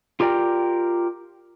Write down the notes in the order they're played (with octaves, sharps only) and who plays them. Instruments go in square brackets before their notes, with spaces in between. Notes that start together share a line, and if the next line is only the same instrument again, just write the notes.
[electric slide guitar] F4 G4 A#4 D5 G5